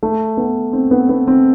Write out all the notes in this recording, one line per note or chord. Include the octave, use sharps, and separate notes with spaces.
A3
B3
C4
B3
B3
C4